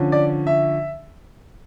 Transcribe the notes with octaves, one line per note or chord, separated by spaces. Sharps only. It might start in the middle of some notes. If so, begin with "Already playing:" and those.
Already playing: D3 F3 C#4
D5
E5